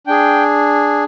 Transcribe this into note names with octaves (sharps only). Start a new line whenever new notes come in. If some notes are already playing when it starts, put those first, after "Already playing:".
D4 G#4 G5